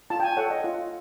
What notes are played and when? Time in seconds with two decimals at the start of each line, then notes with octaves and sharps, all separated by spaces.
0.10 F4 A5
0.20 G5
0.23 G#5
0.37 A4 C#5 F#5
0.50 D#5
0.64 F4